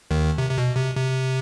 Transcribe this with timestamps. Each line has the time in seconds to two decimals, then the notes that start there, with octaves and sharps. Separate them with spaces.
0.11 D#2 D#3
0.38 C3
0.50 C3
0.58 B2
0.76 C3
0.96 C3